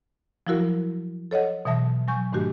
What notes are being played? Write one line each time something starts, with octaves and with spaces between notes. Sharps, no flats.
F3 F#3 E4 F#4 A#4
A4 C#5 D#5 F#5
B2 E3 F#3 E5 A5 A#6
F#3 G#5 C#6 G6
G#2 D#3 A3 D4 F#4 G4